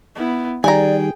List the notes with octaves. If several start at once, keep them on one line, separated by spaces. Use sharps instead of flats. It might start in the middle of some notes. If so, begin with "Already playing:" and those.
B3 E4
D#3 G3 G#4 D5 G5 G#5 A#5